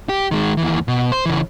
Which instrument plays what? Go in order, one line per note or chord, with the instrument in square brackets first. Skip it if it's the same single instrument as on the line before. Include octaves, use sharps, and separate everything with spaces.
[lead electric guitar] G4
D#3 G#3
D#2 E3
B2
C5
C#3 E3